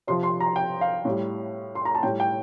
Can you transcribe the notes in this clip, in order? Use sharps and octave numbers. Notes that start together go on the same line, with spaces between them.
C3 F3 C6
C6
A#5
G5
F5
A2 G3
C6
A#5
A5
A2 G3 G5
G5